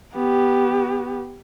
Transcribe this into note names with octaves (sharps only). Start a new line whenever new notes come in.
B3 G4